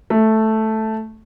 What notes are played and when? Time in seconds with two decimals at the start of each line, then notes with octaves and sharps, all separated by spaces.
0.10 A3